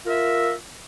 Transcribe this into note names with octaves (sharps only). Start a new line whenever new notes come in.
F4 A#4 E5